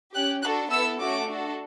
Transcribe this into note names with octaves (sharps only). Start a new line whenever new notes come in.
C#4 G4 F#6
D4 F#4 A4 F#6
B3 E4 A4 E6
A3 C#4 F#4 A4 D6
D4 F#4 A4